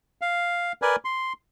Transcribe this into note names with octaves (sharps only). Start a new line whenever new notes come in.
F5
A#4 B4 D5 G#5
C6